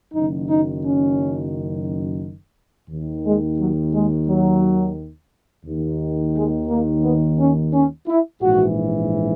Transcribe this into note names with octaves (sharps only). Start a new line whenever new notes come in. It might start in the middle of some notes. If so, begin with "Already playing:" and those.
F#1 F#2 D#3 D#4
D#4
C#4
D#2 D#3
G#3
F#3
G#3
F#3
D#2 D#3
G#3
A#3
B3
C#4
C#4
E4
A#1 G#2 E3 F#4